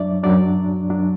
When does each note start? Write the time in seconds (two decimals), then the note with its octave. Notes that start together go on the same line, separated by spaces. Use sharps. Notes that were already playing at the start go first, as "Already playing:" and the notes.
Already playing: F#2 F#3 D4 D5 E5
0.23 F#2 F#3 D4 D5
0.89 F#2 F#3 D4